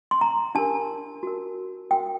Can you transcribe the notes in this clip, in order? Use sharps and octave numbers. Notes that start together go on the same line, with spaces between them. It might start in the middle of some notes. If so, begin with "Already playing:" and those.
C6
A#5
D4 G4 A#4 A5
F#4 A#4
F#4 A#4 G5